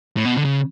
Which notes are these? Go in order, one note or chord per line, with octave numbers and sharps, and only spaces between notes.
A2
B2
D3
C#3